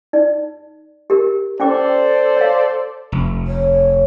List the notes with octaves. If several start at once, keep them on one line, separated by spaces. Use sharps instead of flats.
D#4 D5
G4 A#4
C#4 A4 C5 D5 G5 D6
C#5 F5
F1
C#5